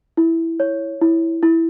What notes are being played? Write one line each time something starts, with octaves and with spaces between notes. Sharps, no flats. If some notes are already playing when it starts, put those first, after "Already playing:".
E4
C#5
E4
E4